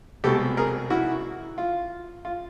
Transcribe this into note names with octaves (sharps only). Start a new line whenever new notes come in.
C2 B2 G#3 G4 A4
G#4 A#4
E4 F#4
F4
F4